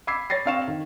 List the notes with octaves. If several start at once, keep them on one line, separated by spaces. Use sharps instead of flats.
B5 D6 E6 G#6 B6 C7
C#5 B5 A6 A#6 C7
C4 D4 F5 C#6 E7
D#3